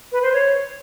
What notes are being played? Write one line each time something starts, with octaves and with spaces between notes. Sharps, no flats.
B4
C5
C#5